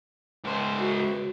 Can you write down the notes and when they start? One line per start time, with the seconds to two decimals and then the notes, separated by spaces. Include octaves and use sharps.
0.44 C#2 C5
0.80 F#4